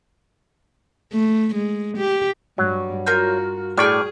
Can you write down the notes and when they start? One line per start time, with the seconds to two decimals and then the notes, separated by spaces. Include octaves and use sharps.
1.12 A3
1.54 G#3
1.97 G4
2.58 G2 F#3 G3
3.06 F4 F#4 A#4 G6
3.77 A2 G#4 D5 G5 C#6 F6